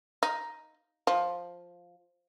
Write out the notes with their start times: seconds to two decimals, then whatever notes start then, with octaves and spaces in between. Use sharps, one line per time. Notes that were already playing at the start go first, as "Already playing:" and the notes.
0.23 D#4
1.07 F3